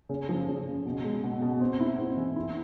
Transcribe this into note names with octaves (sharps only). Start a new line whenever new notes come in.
C#3
F3
C#3
C#3
B2
G#3
B2
B2
C4
E4
C4
E3
E4